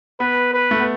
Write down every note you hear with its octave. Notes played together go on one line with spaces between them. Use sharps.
B3 B4
B4
A3
B3